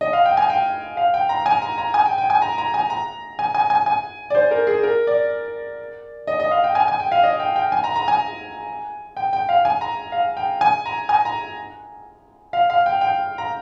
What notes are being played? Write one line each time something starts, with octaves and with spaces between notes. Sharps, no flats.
D#5
F5
G5
G#5
G5
F5
G5
A#5
G#5
A#5
A#5
G#5
G5
G5
G#5
A#5
A#5
G#5
A#5
G#5
G#5
G#5
G#5
D5
C5
A#4
G#4
A#4
D5
D#5
D#5
F5
G5
G#5
G#5
G5
F5
D#5
G5
G5
G#5
A#5
A#5
G#5
G5
G5
F5
G#5
A#5
F5
G5
G#5
A#5
G#5
A#5
F5
F5
G5
G5
A#5